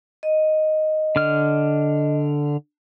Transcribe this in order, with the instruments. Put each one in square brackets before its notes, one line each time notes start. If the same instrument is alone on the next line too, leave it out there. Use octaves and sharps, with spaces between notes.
[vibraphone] D#5
[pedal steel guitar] D3 F6